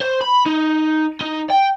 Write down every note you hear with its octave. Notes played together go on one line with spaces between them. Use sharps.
C5
B5
D#4
D#4
G5